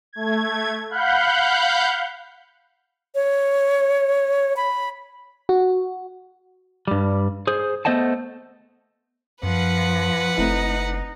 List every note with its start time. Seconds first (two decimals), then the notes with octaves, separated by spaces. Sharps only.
0.13 A3 G#6
0.90 F5 F#5 B5 F#6 G6
3.15 C#5
4.57 B5
5.49 F#4
6.88 G2 G3
7.47 G#4 C5
7.85 A3 B3 C5 D#5 F#5 A5
9.43 F#2 F3 B4 F#5
10.38 F#1 A3 C4 D#4 E4